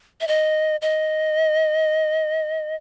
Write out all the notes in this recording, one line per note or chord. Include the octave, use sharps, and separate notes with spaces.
E5
D#5
D#5